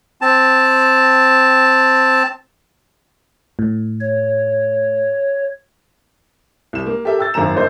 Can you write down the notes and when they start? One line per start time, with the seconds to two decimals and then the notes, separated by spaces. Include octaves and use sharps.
0.21 C4 A5
3.59 A2
4.00 C#5
6.73 C2 E7
6.86 A#3
7.05 G4 A4 A#4 E5
7.19 G5 E6 A6
7.34 G#1 F#2 A#3 A#5 E7
7.55 G1 A#3 C5 D#5